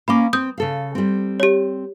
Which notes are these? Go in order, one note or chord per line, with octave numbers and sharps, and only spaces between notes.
A#3 C#4 F5 B5 D6
C4 D#6 G6
C#3 A4 F5
G3 C4
G4 C#5